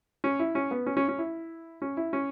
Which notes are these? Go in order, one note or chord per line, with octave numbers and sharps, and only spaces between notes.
C#4
E4
C#4
B3
C#4
C#4
C#4
E4
C#4
E4
C#4